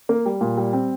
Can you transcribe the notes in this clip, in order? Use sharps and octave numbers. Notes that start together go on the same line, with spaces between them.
A#3
G3
A#2
G3
C4